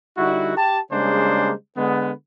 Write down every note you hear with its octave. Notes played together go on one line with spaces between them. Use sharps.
D3 G3 D#4 E4 F#4
G4 A5
C#3 G3 G#3 A#3 D4 C5
D3 G#3 B3